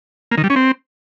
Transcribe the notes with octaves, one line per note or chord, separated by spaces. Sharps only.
A#3
D#3
G3
C#4
C4